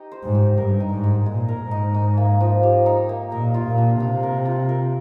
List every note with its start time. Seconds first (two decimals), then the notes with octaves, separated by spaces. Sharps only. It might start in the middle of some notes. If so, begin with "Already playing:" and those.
Already playing: D#4 G4 D#5
0.12 C5
0.23 G#2
0.35 G4
0.57 G2 A#4
0.80 D#4
0.91 G#2
1.04 G#3
1.25 A#2 G#3
1.48 A#4
1.61 G#2
1.71 D#4
1.94 D#4
2.17 A#3
2.41 F3
2.63 G4
2.86 D#4
3.09 A#3
3.32 A#2 A#4
3.54 F4
3.66 A#2
3.78 D4
4.00 C3 F5
4.23 A#4
4.45 F4
4.69 A#4